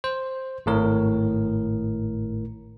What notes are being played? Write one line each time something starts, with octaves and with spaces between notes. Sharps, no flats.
C5
G#1 A2 A#4